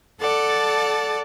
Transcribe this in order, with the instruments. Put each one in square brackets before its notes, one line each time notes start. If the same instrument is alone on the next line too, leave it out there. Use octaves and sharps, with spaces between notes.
[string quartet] A4 D5 F#5 A5